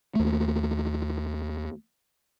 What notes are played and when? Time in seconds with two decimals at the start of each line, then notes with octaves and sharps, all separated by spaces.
0.15 D#2 A3